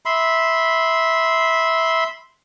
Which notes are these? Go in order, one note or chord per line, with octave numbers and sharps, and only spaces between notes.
E5 B5 C6